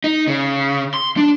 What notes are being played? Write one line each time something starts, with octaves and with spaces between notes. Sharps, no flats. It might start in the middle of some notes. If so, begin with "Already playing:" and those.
D#4
C#3
C6
D4